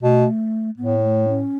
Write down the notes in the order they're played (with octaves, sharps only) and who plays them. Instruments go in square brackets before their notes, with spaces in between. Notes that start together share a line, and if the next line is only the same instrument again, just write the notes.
[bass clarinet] B2 [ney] A3
[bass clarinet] A2 [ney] B3
[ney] B3
A3
C#4